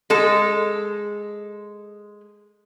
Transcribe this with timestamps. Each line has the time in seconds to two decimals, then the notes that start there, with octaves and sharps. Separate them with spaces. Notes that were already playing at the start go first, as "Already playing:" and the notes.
0.10 G#3 A4